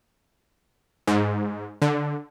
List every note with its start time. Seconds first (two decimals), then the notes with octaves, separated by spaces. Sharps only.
1.07 G#2
1.82 D3